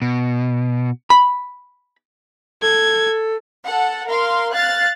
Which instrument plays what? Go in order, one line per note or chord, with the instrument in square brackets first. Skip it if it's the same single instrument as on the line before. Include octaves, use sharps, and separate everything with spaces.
[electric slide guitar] B2
[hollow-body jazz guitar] B5
[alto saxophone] A4 [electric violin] G#6
[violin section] A4 F#5
A#4 F5 C6
F5 F#6 A6